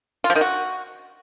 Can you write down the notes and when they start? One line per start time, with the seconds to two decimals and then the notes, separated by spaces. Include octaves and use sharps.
0.24 F4
0.30 F3
0.35 D#3
0.41 F#4